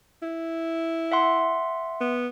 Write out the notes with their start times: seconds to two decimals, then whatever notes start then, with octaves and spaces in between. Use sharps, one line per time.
0.22 E4
1.12 E5 F#5 C6
2.00 B3